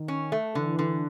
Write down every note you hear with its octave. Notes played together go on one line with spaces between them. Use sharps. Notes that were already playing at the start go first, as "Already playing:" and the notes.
Already playing: D#3
C#4
A3
D3 E3
D3